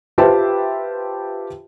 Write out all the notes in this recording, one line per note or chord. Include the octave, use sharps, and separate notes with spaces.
F4 G4 B4 C5 E5 A5